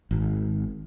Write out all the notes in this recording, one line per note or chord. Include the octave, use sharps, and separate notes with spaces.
G#1